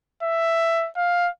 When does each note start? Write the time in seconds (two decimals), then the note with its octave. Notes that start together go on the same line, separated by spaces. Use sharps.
0.23 E5
0.96 F5